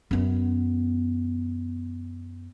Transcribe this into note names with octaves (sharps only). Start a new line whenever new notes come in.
F#2 B3